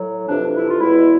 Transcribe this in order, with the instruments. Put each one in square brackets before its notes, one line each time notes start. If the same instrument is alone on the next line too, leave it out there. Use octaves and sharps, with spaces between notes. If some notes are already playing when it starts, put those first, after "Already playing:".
Already playing: [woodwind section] A2 F#3
F2 C3 E3 D4
E4
F4
E2 B2 G#3 E4